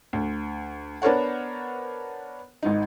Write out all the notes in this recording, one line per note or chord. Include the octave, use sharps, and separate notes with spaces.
D2
B3 D4 A#4 C5 C#5 F#5
G#1 G#2 D#4